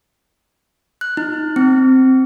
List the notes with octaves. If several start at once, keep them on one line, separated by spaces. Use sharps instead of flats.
F#6
D#4
C4